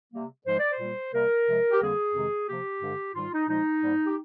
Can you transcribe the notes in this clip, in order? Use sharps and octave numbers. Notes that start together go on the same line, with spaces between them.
C3 G3 A#3
G#2 F3 G#3 C5
D5
C5
A#2 G3 A#3
C3 G3 A#3 A#4
C3 F3 G#3
G4
F2 D3 G3 A#3 G#4
F2 C3 D#3 G#3
C3 F3 A#3 G4
G2 D3 G#3
G#2 D#3 G3 F4
D#4
A#2 F3 G#3 D#4
G#2 G3 A#3
G4